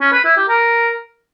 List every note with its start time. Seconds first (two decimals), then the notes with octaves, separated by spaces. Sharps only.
0.01 C#4
0.13 B4
0.25 E4
0.37 G4
0.48 A#4